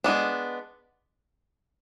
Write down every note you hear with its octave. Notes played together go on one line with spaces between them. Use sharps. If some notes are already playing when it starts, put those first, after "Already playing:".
G#3 B3 D4